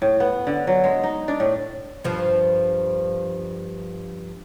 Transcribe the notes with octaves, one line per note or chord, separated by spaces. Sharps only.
A2
B3
D3
F#3
G#3
D#4
D4
A2
G2 F3